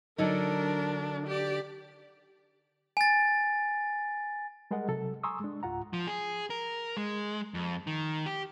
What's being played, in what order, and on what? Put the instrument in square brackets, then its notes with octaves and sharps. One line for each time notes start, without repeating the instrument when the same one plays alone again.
[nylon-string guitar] D3 F#3 D#4 [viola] D4 A#4
[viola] G4 D5
[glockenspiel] G#5 A6
[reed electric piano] G3 G#3 G#4 A#4 D#5 F#5
C3 F#3 A4
G#5 A#5 C6 C#6 D#6 E6
G#3 D4
C#2 G#2 F4 F#5 A#5
[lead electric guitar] F3
G#4
A#4
G#3
F2
D#3
G4